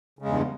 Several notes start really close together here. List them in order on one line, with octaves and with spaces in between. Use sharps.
C#3 G#3 E2 G2